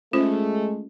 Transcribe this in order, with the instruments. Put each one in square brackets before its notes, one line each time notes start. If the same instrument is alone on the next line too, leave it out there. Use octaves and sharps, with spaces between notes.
[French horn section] G#3 A3 [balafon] C#4 F4 C5